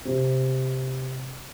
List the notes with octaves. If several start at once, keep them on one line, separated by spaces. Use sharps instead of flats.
C3